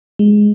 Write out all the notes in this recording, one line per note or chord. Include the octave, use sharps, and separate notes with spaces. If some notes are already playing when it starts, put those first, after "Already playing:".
G#3